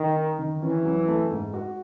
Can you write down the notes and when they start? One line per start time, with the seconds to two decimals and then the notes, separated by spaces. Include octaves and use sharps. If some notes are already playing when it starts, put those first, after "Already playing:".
Already playing: D#3
0.16 D#4
0.39 D#3
0.62 E3 C#4
0.85 F#3
1.08 A3
1.31 G#2
1.54 F#4